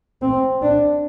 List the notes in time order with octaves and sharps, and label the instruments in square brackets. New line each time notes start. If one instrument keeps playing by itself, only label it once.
[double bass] C4
D4